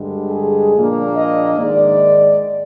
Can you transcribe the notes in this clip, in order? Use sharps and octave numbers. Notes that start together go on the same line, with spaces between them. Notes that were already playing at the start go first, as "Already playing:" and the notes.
Already playing: G2 D3 G#3
G#4
A#2 F3 A#3 D4
D#5
G#2 D#3 G#3 D5